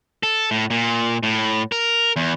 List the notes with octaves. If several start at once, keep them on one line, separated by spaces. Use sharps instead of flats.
A4
A2
A#2
A2
A#4
E2